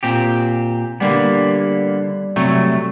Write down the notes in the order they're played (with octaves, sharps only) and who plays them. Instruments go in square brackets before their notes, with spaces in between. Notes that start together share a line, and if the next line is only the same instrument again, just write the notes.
[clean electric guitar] A#2 C4 G4
[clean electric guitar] D3 A#3 B3 [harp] G3
[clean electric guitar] C3 F#3 A3